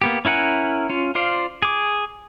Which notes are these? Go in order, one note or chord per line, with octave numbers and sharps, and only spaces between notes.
A#3 B3 G4
C#4 E4 A#4 F#5 G#5
C#4 F4
F4 C5 D5 F5
G#4 D6